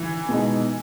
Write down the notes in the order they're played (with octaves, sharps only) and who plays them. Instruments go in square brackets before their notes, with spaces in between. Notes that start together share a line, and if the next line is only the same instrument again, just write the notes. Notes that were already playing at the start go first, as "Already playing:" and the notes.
Already playing: [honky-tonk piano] E3
[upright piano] B2 G#3 D#4